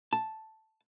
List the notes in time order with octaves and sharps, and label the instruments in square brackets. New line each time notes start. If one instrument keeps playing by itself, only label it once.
[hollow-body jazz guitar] A5